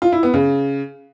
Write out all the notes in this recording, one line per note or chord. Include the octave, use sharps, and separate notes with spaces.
F4
E4
B3
C#3